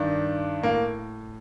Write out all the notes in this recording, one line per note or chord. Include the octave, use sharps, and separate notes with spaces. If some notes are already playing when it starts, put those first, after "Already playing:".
Already playing: G2 D#3 D4
A2 A#3